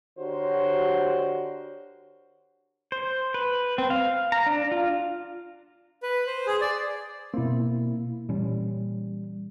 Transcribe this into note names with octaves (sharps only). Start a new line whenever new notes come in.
D3 F#4 G4 A#4 C5 C#5
C5
B4
C4
F5
A#5
D4
F4
B4
C5
G#4
D5
B2 A#3 C4 E4
A#2 E3 G3 C#4